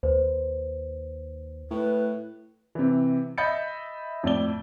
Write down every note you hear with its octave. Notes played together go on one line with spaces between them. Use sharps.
D#2 B4 C5
A2 B4
C3 E3
D#5 E5 B5 G6 A6 C#7
F2 A2 D5 G7